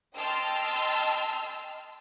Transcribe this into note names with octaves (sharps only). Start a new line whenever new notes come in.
D#5 G5 A5 C6 E6 F6